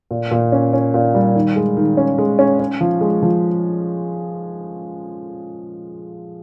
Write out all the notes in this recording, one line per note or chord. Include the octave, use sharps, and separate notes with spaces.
A#2
A#2
C#4
C#4
A#2
G3
D#3
G#3
D#3
C#4
G#3
C#4
C#4
F3
G#3
F3